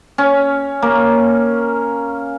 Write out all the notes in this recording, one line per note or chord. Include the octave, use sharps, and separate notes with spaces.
C#4
A#3